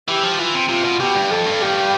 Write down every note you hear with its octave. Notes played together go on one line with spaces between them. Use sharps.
E3 G4
F3
E3 F4
C3
C3 F4
B2
B2 G4
G2
F2 A4
G2
G4